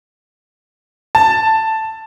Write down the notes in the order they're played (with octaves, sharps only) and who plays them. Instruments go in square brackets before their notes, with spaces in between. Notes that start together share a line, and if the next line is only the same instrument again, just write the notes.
[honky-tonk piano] A5